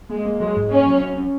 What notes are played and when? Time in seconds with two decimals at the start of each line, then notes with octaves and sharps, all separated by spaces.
0.09 G#3 A#3
0.25 A#3
0.40 F#3 G#3
0.56 G#2
0.71 A#3 C#4
0.86 F#3
1.02 C#4
1.17 C#4